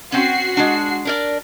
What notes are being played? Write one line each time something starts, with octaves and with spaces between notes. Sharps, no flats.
C4 C#4 F#4 C7
G#3 D4
D4 A#4 D5